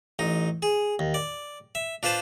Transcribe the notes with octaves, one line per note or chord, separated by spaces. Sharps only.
A1 D#4
G#4
D#2
D5
E5
D4 F4 B4 C5 A5